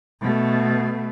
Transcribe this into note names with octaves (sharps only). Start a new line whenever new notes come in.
B2 A3